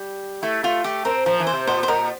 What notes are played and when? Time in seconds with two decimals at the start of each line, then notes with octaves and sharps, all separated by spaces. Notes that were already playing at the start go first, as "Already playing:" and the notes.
Already playing: G3
0.43 A3 E4
0.63 A3 F4
0.84 A3 G4
1.05 C4 A#4
1.26 F3 A#4
1.40 E3
1.47 C5
1.53 C3
1.67 A#2 C5
1.83 C5
1.88 A#2 A#4